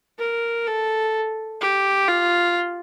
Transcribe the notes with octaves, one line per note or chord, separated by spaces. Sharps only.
A#4
A4
G4
F4